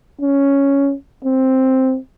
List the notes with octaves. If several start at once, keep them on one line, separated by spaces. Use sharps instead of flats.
C#4
C4